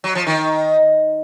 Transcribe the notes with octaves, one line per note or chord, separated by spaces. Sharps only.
F#3
F3
D#3